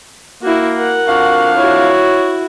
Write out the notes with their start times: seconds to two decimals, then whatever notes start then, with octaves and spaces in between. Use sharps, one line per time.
0.43 A#3 E4 F#4
0.77 A#4 F#5
1.08 F2 D4 F#4 F5
1.57 E4 F#4 C#5